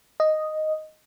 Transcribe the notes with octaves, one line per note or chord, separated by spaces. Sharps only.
D#5